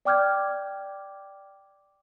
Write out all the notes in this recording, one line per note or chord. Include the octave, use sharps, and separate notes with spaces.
D5 G5 D6 F6 G6 G#6